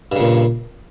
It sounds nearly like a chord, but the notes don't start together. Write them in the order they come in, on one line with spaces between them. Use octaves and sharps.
G2 C#3 A#2